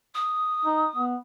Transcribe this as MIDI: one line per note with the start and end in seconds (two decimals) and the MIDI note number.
0.14 1.03 87
0.65 0.87 63
0.96 1.16 59